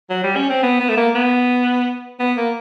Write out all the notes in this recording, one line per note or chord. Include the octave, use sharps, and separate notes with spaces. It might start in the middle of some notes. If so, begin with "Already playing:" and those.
F#3
G3
C#4
C4
B3
B3
A3
A#3
B3
B3
A#3